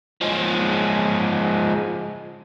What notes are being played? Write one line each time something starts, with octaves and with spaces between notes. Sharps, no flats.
F3 G#3